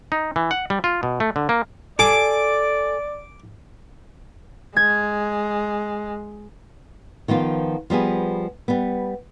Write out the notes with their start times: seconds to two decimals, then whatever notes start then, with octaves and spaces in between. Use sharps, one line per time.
0.12 D#4
0.36 E3
0.51 F#5
0.70 G3
0.84 F4
1.03 B2
1.20 A3
1.36 D3
1.49 A#3
1.99 A4 D5 G#5 D6
4.77 G#3 G#6
7.28 D#3 F3 B3 F4
7.90 F3 G3 B3 G#4
8.68 G3 B3